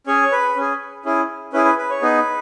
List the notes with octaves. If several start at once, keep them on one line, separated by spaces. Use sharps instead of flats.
C#4 G#4 C#5
B4
C#4 G#4
C#4 E4 G#4
C#4 E4 G#4 B4
B4
B4
C#5
B3 D#4 G#4 B4